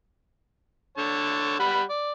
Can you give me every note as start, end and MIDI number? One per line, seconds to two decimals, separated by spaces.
0.98 1.59 50
0.98 1.59 73
0.98 1.59 81
1.59 1.83 55
1.59 1.83 78
1.59 1.83 83
1.89 2.12 74